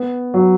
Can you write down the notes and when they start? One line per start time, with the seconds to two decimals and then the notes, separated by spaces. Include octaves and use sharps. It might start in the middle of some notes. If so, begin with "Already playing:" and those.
Already playing: B3
0.34 F#3